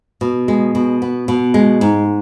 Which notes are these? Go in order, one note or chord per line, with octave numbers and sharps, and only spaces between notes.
B2
G#3
B2
B3
B2
G#3
G#2